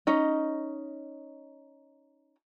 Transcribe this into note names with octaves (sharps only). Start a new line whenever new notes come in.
C#4 D#4 D#5